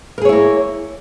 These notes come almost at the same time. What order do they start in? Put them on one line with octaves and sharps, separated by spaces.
A#4 G#4 C#5 E4 A#3